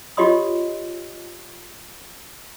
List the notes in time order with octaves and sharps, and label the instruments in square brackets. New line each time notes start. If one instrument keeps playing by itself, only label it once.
[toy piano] F4 G4 C#5 D#5 C6 D#6